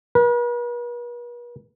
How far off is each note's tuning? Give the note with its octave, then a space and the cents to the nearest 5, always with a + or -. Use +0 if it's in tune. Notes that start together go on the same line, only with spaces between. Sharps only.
B4 -45